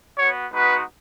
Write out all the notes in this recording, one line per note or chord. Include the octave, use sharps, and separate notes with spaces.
B3 F#4 C#5
G#3 B3 D#4 F#4 B4